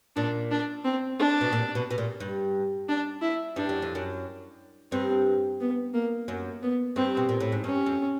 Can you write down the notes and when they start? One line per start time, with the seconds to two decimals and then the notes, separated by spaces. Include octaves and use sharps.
0.16 A#2 D4
0.51 D4
0.84 C4
1.19 D4
1.41 B2
1.53 A#2
1.75 B2
1.91 B2
1.98 A#2
2.20 G2
2.89 D4
3.22 E4
3.56 G2 D4
3.69 F#2
3.82 F2
3.95 F#2
4.92 G2 C4
5.60 B3
5.94 A#3
6.28 F#2
6.63 B3
6.96 G2 C4
7.17 B2
7.29 A#2
7.40 A2
7.52 G#2
7.64 G2 C#4
7.86 F2